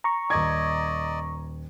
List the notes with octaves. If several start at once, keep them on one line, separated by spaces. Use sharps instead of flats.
A#5 C#6
D#1 D5 D#5 G#6